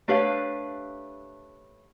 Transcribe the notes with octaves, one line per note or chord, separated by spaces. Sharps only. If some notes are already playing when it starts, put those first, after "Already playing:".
A3 D4 G4 B4 C#5 F5